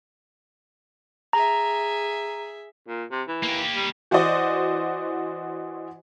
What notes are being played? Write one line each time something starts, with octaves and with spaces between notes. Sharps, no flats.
G#4 E5 A#5
A#2
C3
E3
A#3 G4
G3
E3 F#4 C5 D5 D#5